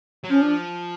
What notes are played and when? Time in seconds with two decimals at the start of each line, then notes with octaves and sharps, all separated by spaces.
0.24 F#3
0.30 F3 C#4
0.41 D4